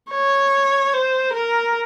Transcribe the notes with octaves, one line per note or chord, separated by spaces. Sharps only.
C#5
C5
A#4